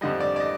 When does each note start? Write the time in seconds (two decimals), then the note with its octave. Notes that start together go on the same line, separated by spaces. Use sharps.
0.01 F2 D3 G3 D#5
0.20 D5
0.36 D5
0.40 D#5